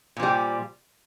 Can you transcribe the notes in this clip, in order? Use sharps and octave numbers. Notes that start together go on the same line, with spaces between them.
A#2 F3 G3